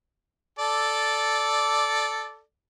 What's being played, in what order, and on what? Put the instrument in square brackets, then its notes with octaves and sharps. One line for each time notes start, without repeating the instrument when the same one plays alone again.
[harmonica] A4 D5